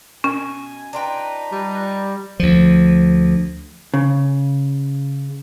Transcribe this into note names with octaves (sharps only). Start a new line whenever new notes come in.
B2 C#4 G#5
D4 D#4 F4 B4 G5 A#5
G3
D2 F3
C#3